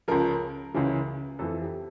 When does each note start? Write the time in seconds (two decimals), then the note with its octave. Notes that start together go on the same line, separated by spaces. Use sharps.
0.08 C#2 C#3 F3 A#4
0.74 C#2 C#3 E3
1.39 F2 E3 A4
1.62 G4